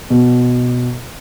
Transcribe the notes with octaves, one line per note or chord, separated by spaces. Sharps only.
B2